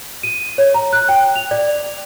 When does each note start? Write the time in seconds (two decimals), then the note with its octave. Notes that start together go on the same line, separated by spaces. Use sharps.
0.23 D#7
0.58 C#5
0.74 A#5
0.93 F#6
1.09 G5
1.35 F7
1.51 D5